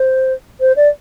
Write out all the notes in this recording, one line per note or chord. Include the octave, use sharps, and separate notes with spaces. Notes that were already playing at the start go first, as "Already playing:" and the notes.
Already playing: C5
C5
D5